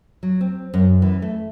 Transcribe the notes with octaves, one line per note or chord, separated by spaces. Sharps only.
F#3
C4
F#2
E3
A3